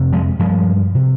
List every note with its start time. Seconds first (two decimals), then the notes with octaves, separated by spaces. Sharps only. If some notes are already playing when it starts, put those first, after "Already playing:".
Already playing: F2 C3
0.13 F3 G#3
0.39 G2 F3 G#3
0.95 C3